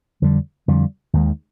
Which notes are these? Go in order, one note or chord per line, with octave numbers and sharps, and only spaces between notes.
F2 D3 G3
F2 D3 G3
D#2 D#3 G#3